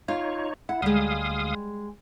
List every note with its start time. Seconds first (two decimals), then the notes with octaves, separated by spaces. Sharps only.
0.08 D#4 F4 C#5
0.69 E4 F#5
0.82 D2 G3 G#3 F5 D#6